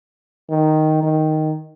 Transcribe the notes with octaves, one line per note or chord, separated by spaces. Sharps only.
D#3
D#3